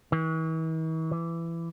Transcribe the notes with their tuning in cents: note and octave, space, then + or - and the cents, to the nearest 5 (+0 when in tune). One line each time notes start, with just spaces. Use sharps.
E3 -45
E3 +20